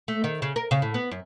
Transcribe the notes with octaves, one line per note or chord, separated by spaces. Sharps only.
A3
D#3
C#3
A#4
C#3
A2
B3
F#2